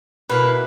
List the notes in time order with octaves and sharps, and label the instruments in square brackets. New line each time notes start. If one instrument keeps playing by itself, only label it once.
[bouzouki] B2 A#3 E4 [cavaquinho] B4